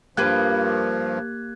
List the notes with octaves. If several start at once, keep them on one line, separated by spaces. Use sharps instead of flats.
G2 F3 A#3 G4 B4 F#6 G#6